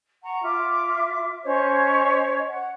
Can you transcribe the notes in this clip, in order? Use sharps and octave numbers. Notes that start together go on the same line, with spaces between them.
F#5 A#5 C#6
F4 E5 D6
C#4 C5 C#5 D#5
F#5